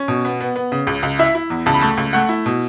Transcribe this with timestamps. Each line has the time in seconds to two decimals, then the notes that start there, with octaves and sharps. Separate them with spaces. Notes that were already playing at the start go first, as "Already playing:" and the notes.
Already playing: C#4
0.08 B2
0.25 B3
0.41 B3
0.56 B3
0.72 C#3
0.87 C#2
1.03 C#2
1.19 E4 E5
1.35 E4
1.50 E2
1.66 C#2 A5
1.74 B5
1.81 A3 A5
1.97 C#2
2.13 A3 F#5
2.29 E4
2.46 B2